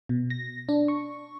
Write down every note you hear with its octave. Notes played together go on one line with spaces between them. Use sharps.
B2
A#6
D4
C#6